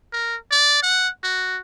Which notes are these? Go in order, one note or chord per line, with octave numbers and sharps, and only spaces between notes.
A#4
D5
F#5
F#4